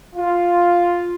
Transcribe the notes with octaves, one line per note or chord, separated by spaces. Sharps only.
F4